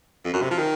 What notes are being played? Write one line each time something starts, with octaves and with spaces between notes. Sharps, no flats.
F2
F#2
C3
F3
D#3